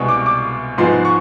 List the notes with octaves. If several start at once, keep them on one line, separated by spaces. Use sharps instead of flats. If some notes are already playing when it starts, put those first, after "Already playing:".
Already playing: C2 B2 G#3 B3 C#6
D6
D6
G#2 F3 G#3 B3 C6
C#6